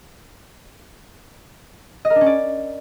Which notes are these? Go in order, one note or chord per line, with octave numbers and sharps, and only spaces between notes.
D#5
A#4
D4
C#4
D5